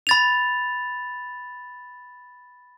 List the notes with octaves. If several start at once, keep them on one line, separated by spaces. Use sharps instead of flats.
B5 A6 F7